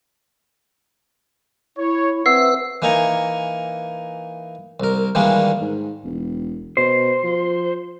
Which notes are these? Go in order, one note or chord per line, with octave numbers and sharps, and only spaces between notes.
E4 C#5
C4 B4 E5 F#5 E6 C7
E3 A#3 D#4 G#5 A#5 C#6
C2 A#4
D#3 E3 G3 G#3 A#3 D4
G#2
E1
B2 C5
F3